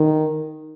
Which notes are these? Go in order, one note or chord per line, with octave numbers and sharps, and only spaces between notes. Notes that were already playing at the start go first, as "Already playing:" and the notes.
Already playing: D#3